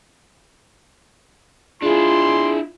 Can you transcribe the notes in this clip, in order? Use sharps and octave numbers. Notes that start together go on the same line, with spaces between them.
D4 E4 F4 G#4 C6